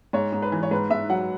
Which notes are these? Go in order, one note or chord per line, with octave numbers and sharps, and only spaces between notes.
G#2 C#5
G#2
B4
E3
C#5
G#2 B4
G#2 E5
F#3 F#5